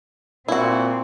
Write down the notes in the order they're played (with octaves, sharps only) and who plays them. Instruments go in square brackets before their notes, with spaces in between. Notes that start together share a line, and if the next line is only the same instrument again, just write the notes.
[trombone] A#2 [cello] C4 [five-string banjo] E4 F#4